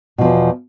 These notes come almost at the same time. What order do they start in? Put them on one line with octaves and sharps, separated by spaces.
B2 F3 E2